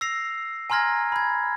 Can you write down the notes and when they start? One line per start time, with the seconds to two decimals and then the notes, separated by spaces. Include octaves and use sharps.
0.01 E6 A#6 C7 F7
0.70 G#5 A#5 C6 F6 G#6 A#6
1.12 B5 G#6